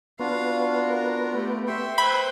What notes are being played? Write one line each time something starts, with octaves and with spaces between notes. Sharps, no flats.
B3 D4 F4 F#4 F5
A#4
A3 G4
E5 G5 C6 C#6
B4 C5 B5 E6 G6 G#6